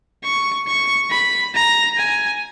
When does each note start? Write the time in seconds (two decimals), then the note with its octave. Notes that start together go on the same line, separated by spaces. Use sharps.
0.23 C#6
0.67 C#6
1.10 B5
1.54 A#5
1.97 G#5